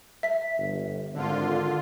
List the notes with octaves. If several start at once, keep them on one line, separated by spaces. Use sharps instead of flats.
E5 B6
G1
G#1 D3 F4